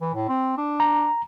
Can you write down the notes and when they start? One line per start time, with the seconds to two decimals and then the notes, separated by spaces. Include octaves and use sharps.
0.01 E3
0.15 A2
0.29 C4
0.58 D4
0.80 A#5